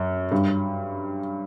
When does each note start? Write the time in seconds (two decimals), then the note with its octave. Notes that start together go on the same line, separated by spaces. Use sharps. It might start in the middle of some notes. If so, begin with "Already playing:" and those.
Already playing: F#2
0.31 G2